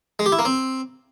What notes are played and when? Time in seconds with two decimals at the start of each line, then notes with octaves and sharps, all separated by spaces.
0.19 G#3
0.26 G4
0.32 E4
0.39 A#3
0.45 C4